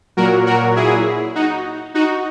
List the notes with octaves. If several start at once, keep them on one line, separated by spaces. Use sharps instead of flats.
A#2 F#3 F#4 A#4
F#4 A#4
E4 G#4
D#4 F#4
D#4 F#4